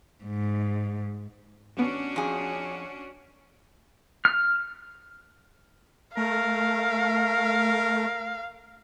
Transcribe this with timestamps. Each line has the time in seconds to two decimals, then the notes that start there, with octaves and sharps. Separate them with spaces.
0.24 G#2
1.77 A1 B3 C#4 D4 F#4
2.16 F2 G#4
4.25 F6
6.17 A3 A#4 F5